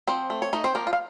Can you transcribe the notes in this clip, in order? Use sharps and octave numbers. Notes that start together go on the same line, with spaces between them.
F3 C4 C5
A3
C#5
A3 D#4 D#5
C4 C5
F3 A#3 A#4
F4
F5